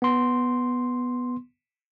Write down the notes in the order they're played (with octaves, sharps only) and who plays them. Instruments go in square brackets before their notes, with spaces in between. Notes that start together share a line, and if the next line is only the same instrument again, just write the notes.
[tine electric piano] B3 C6